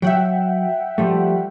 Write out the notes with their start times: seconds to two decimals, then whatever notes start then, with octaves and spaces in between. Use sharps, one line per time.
0.02 F#3 E5 F#5 G5
0.98 F3 G3 A3